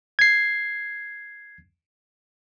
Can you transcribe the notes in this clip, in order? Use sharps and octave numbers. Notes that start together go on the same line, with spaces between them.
G#6 C7